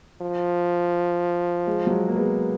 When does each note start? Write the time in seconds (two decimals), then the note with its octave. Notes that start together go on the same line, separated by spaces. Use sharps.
0.21 F3
1.67 G#3
1.87 F#3
1.91 G#3
2.08 A#3
2.15 G#3 B3